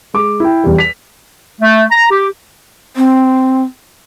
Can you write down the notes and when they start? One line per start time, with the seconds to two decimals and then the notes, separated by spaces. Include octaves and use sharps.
0.14 G#3 D6
0.40 E4 G5
0.64 E2 G3
0.78 B6 F7
1.61 A3
1.92 A#5
2.11 G4
2.96 C4